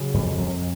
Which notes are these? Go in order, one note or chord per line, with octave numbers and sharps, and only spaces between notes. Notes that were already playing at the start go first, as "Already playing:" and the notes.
Already playing: C#3 F#3
F2
F2